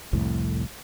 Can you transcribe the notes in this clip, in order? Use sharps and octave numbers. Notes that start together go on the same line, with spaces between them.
C2 F2 A2